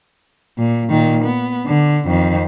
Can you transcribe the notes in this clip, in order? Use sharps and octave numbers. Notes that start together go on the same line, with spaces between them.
A#2
A#2 D#3
B3
D3
F2 D#3